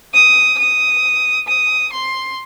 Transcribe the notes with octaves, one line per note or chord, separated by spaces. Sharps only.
D#6
D#6
D#6
C6